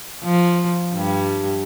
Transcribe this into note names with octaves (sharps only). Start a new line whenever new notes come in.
F3
G2 G3